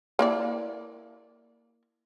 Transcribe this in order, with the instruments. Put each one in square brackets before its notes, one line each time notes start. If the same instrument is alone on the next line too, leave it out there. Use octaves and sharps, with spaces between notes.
[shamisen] A#3 E4 D5